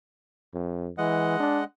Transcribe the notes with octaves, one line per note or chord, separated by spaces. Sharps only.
F2
E3 G#3 D#5 F#5
D4